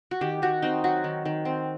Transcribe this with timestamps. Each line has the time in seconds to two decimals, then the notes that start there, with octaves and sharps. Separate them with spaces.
0.11 F#4
0.21 D#3 G4
0.42 D#3 F#4
0.62 C4 D#4
0.84 F#3 F#4
1.04 D#3
1.25 D#3
1.45 C4